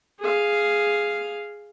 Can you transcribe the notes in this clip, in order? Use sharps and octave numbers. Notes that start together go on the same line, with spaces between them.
G#4 F5